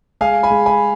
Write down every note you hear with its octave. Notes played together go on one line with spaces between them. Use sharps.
G#3 F5 G#5
G#5 B5
G#3
G#5 B5